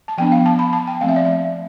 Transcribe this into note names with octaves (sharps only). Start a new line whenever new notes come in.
A5
F3 B3 D4 G5
F5
A5
B5
A5
G5
F3 A3 C4 F5
E5
D5
E5